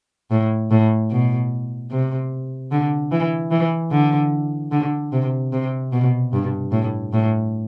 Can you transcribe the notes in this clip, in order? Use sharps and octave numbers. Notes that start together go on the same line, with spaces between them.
A2
A2
B2
C3
D3
E3
E3
D3
D3
C3
C3
B2
G2
A2
A2